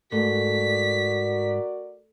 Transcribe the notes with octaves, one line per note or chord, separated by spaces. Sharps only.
G#2 A3 F#4 A#4 D5 B6